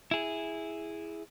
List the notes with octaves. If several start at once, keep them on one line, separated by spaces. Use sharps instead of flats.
E4 G#4